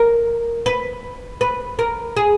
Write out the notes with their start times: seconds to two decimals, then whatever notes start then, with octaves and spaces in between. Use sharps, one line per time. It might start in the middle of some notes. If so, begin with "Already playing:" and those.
Already playing: A#4
0.66 B4
1.41 B4
1.79 A#4
2.16 G#4